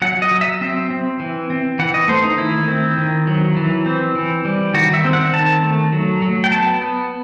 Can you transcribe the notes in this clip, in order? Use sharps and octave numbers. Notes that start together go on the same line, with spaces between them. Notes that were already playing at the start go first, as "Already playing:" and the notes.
F#3 F#5
D#5
F#3
E5
C4 E5
C4
E3
C4
E3 F#5
D#5
A3 C5
D#4
D#3 E4
C4
D#3
F#3
E3
C4
E3
G3
D#3 F#4
E5
C4
F#5
D#3 A5
A3
F#3
F#3
G5
B3 A5
B3